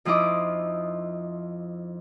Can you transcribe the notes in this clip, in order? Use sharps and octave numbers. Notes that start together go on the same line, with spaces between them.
F2 F3 D#4 E4 D#5 D6